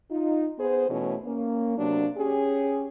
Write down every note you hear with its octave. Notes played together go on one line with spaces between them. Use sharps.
D#4 F4
B3 G#4 C5
B2 E3 A3 C#4 E4 C#5
A#3 C#4
C3 F#3 A#3 B3 D4
C#4 G4 G#4